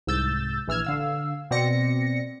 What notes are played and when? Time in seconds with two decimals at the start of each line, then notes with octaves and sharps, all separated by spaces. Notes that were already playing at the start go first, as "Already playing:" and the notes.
0.07 C2 G#2 E6 G6 A6
0.67 A#1 E3 E6 F6 G#6
0.84 D3 F5 E6
1.51 B2 C4 D5 A#6 C#7